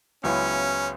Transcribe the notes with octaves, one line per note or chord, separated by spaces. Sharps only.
C#2 C#3 F#3 B3 C#4 E4